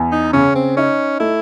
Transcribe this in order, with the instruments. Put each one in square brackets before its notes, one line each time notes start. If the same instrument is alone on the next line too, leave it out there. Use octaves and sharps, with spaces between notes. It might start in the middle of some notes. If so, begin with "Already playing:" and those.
Already playing: [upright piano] E2
[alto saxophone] D#4
[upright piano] C#3 [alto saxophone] C#4
[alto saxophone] C4
[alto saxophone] C#4 [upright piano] D#4
[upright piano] A3 [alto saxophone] E4